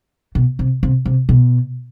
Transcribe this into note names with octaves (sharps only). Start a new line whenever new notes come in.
B2
C3
C3
C3
B2